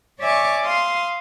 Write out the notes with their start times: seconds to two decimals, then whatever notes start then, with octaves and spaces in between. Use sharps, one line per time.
0.19 C#5 D5 E5 G#5 C#6 D6
0.64 F5 C6 D#6